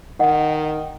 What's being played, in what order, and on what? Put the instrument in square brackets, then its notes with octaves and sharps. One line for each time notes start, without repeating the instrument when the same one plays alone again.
[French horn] D#3 [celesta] D#5 F#5